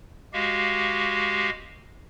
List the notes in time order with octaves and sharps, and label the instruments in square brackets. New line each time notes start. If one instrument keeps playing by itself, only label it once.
[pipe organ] G#3 F#4 G4 F5